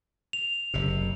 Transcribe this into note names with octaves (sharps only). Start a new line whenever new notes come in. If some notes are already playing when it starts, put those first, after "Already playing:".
F7
F#1 C3